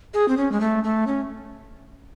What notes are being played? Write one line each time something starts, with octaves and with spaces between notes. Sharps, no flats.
G#4
C4
C#4
G#3
A3
A3
C#4